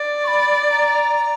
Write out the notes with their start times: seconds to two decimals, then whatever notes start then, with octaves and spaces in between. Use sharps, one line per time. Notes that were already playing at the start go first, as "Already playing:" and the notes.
Already playing: D5
0.24 C#6
0.28 B5
0.71 A#5